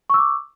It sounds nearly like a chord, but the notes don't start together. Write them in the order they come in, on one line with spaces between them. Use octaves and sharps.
C#6 E6 D6